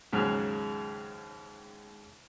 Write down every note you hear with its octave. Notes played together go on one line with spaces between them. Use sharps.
D#2 G#2 C#3 F#3